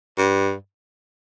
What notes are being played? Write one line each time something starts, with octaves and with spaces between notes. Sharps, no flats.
G2